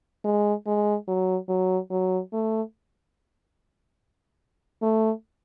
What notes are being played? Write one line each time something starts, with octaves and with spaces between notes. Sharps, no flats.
G#3
G#3
F#3
F#3
F#3
A3
A3